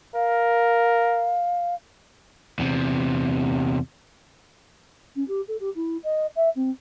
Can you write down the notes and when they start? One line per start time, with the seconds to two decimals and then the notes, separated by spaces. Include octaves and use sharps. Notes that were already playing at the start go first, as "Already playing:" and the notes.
0.14 A#4 F5
2.59 E2 C3
5.15 C#4
5.28 G4
5.47 A4
5.60 G4
5.75 E4
6.03 D#5
6.36 E5
6.55 C4